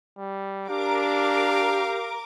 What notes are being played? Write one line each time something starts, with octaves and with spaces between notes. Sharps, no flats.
G3
D4 G4 A#4 F5 D6